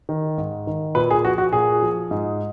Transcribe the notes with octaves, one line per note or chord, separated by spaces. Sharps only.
D#3
G#2
D#3
A#2 B4
G#4
F3 F#4
F#4
A#2 G#4
F3
G#2